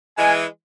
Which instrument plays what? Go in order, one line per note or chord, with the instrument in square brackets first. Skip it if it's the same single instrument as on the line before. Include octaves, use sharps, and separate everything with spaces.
[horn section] E3 G#3 [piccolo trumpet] G#5